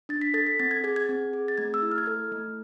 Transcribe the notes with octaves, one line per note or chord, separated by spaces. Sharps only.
D4 A6
B6
A4 A6
B6
C4 A6
G#6
G#4 G#6
G#6
C4
G#4
A6
A3 G#6
E6
E4
F6
G#6
A4 F6
A3